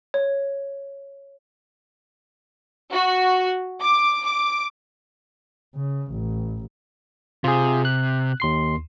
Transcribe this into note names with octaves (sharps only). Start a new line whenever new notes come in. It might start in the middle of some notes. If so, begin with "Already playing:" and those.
C#5
F#4
D6
D6
C#3
A1
C3 F4 G#4
F#6
D#2 C6 C7